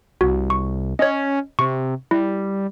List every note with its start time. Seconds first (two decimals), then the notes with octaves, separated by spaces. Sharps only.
0.21 C2 F#4
0.50 C#6
0.99 C#4 C#5 D#5
1.59 C3 C#6
2.11 G3 E4